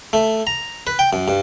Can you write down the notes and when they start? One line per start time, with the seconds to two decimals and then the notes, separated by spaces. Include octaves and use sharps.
0.13 A3
0.47 A#5
0.87 B4
0.99 G5
1.13 F#2
1.28 G2